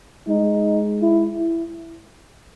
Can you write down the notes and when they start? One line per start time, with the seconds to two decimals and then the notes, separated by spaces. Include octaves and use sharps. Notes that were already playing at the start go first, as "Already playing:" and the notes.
0.28 G#3 D#4
1.02 E4
1.38 E4